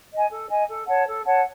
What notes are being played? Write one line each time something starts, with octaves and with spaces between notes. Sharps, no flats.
D#5 G#5
A4
D#5 G#5
A4
C#5 F#5 A5
A4
C#5 F#5 A5